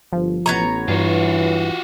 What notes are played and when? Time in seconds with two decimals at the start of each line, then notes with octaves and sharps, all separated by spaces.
0.13 G1 F3
0.46 A1 B3 C#5 A#5
0.88 G2 E3 F4 F#4